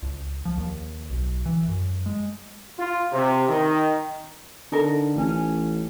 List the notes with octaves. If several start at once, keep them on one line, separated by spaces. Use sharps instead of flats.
C#2
F3
D#2
B1
E3
F#2
G#3
F4
C3
D#3
D3 D#4 A4 A#4
A1 C#4